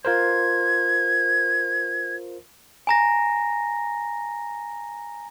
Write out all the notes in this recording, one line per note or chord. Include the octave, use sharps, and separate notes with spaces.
F4 A#4 C5 G#6
G#5 A#5 A#6